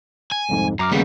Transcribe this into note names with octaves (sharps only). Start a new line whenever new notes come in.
G#5
C2 F2 G#2
F#2 A#5 D6 F6
D#2 C#3 G3 A3 B3